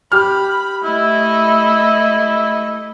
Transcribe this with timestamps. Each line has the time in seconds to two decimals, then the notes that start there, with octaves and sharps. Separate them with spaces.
0.12 G4 B5 F6
0.84 A3 E4 D#5